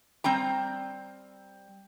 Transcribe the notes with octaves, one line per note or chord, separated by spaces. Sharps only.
G3 C4 G5 A#5